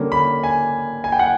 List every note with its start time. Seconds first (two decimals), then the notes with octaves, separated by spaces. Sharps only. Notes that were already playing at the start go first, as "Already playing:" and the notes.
Already playing: D3 G3 A#3 C#4
0.12 B5
0.44 G#5
1.04 G#5
1.12 G5
1.19 F#5